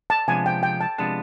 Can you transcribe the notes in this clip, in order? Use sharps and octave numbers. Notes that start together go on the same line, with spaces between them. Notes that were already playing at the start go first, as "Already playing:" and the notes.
A5
C3 F3 G#3 B3 D4 G#5
G5
G5
A5
C3 F3 G#3 B3 D4 A5